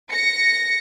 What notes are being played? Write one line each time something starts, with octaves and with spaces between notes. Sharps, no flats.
A#6 C#7